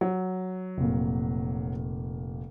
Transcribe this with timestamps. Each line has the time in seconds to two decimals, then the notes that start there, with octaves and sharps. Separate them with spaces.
0.01 F#3
0.77 F1 A#2